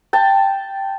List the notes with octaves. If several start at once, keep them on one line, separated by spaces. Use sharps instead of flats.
G5 A5